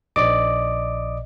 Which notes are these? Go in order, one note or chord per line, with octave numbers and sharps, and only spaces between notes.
A#1 D5 D#5 D6